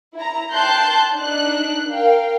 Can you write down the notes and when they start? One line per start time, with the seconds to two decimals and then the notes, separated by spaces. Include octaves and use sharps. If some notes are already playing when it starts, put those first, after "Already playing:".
0.16 E4 A#5
0.53 G5 A5 C6 F#6 G6
1.15 D4 D#4 F#6
1.91 A#4 F5 G5